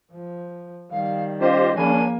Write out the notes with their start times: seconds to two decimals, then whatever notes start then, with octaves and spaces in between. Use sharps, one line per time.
0.12 F3
0.91 D#3 G3 F5
1.40 C#4 F4 G4 C5 D#5 F5
1.76 F3 A#3 C#4 D4 G#4 G#5 B5